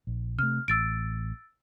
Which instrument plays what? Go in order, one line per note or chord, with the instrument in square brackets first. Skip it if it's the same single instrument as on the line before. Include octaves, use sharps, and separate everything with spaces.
[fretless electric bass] A#1
[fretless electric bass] C3 A3 [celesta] F6
[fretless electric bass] A1 [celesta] E6 A6 D7